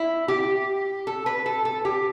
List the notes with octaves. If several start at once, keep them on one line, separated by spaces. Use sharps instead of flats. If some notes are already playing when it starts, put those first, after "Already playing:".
Already playing: E4
G4
A4
B4
A4
A4
G4